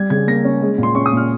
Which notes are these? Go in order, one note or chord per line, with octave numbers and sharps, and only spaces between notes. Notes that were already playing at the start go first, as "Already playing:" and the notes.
Already playing: G3 G#6
C#3 G#6
A#3 A#6
C#4
G#3
A#2 C6
C#4 C#6
D#6
A#2 F6